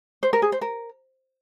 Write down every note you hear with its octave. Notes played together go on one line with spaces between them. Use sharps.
C5
A#4
G#4
C5
A#4